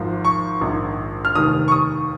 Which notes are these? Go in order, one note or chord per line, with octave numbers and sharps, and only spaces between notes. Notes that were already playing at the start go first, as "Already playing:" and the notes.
Already playing: G#1 G#2 F3
C#6
A#1 G#2 D#3
F6
F1 D#2 D#3 D#6
C#6
D#6